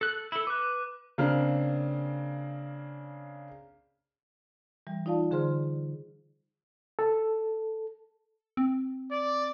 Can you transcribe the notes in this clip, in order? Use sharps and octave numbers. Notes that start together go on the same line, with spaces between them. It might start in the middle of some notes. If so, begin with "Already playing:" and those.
A4 F#6
E4 A4
B4 D6 F#6
C#3 A#3 C4 D4 F6
E3 G3
D#4 F4 D5 F5 A5
D3 G#4 C5 C6 F6
A4
C4
D5